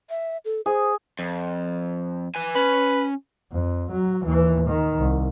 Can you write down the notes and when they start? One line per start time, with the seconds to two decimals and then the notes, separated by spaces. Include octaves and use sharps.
0.10 E5
0.45 A4
0.66 G#4 C5
1.19 F2
2.35 B4 G#5
2.55 C#4 B4
3.52 F2
3.92 F#3
4.24 D#2 E3
4.68 D#3
4.99 C2